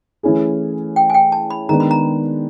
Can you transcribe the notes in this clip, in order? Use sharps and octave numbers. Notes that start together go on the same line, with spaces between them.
E3 A3 C#4 E4 G#4
G5
G#5
G5
A5
B5
D#3 G#3 B3 D4 A#5
B5
A#5